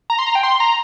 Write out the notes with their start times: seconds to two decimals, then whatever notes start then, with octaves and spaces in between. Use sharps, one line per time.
0.10 A#5
0.19 C6
0.27 A#5
0.35 G5
0.43 C6
0.60 A#5